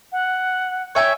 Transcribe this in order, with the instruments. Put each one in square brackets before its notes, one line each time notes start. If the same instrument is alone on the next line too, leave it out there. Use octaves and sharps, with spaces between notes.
[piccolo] F#5
[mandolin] C#5 E5 G#5 [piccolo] G5